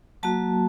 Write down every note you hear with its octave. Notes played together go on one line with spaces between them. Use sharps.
F#3 A#3 F#4 A5